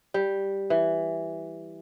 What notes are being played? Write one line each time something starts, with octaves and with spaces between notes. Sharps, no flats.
G3
E3